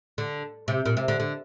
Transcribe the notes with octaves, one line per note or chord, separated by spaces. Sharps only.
D3
C3
A#2
C3
D3
D3